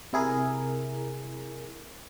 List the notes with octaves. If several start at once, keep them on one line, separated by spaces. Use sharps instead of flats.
C3 E4 G#4 A#4